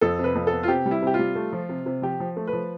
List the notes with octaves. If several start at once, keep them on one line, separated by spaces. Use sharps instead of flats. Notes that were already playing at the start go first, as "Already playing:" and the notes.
F2 A4
C3
B4
F2
A4
B3
F4
C3 G4
G3
E4
C3 G4
F4
G3
A3
F3
C3
C3
F3 G4
F3
A3
B4
F3